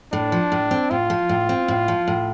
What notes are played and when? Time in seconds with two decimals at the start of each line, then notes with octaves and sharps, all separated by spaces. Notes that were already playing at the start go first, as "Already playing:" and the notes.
0.13 A2 D4
0.32 F3
0.52 A2
0.71 C4
0.91 A2 F4
1.10 F3
1.29 A2
1.49 C4
1.68 A2
1.88 F3
2.08 A2